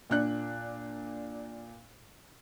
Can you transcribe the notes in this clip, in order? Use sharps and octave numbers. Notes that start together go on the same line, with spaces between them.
A#2 D4 F#6